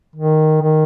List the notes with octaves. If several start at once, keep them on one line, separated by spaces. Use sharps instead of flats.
D#3
D#3